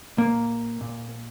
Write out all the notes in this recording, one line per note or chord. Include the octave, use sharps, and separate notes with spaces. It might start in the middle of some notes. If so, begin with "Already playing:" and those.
A#2 A#3
A#2